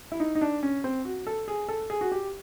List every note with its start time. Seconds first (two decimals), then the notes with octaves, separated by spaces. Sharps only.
0.12 E4
0.20 D#4
0.35 D#4
0.41 D4
0.63 C#4
0.84 C4
1.05 F#4
1.27 A4
1.48 G#4
1.69 A4
1.90 G#4
2.01 F#4
2.12 G4